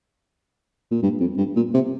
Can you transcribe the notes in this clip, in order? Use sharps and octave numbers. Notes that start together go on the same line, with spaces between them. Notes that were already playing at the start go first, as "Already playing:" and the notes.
A#2
G2
F2
G2
A#2
C3